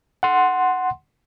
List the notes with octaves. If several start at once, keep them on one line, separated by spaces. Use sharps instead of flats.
F#5 C6